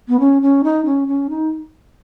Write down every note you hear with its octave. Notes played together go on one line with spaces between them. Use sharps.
B3
C#4
C#4
D#4
C#4
C#4
D#4